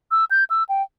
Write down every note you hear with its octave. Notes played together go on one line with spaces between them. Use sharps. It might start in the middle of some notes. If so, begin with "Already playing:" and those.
E6
G6
E6
G5